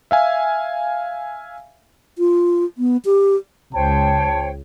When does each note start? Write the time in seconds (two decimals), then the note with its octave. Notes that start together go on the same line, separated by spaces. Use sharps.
0.11 E5 F5 G#5
2.18 F4
2.78 B3
3.05 G4
3.74 C#2 C5 C#5 G5 A5